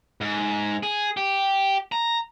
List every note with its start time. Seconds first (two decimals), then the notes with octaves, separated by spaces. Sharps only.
0.21 G#2
0.83 G#4
1.17 G4
1.92 A#5